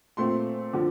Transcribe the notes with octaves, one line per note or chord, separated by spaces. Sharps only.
A#2 A3 C4 C6
D3 F3